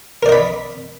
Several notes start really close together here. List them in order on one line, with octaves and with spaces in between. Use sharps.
A#4 D5 D#5 B5